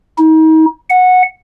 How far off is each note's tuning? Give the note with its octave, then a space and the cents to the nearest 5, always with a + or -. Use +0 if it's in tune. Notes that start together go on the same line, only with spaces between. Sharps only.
D#4 +35
F#5 -15